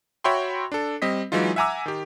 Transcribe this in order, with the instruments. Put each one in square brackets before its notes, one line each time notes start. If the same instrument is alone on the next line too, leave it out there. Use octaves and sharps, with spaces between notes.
[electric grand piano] F#4 C#5 E5 G5 B5 C6
D4 A4
G3 C4 D#5 B6
E3 F#3 G#3 D#4 F4
E5 F#5 G#5 A#5 D6 E6
D#3 G4